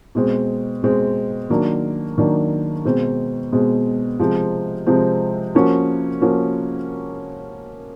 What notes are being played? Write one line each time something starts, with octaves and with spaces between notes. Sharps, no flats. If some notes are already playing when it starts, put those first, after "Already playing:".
B2 G#3 C4
B2 G#3 C4
D#3 F#3 A#3 D4
D#3 F#3 A#3 D4
B2 G#3 C4
B2 G#3 C4
C3 F3 G#3 C4
C3 F3 G#3 C4
F3 A#3 C#4 F#4
F3 A#3 C#4 F#4